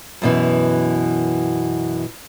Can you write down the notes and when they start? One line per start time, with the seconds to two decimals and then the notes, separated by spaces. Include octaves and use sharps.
0.22 F#2 B2 E3